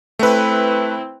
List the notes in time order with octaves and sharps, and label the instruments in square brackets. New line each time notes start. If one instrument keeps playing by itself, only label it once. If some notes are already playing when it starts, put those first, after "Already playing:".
[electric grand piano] A3 B4 [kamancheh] C4 E4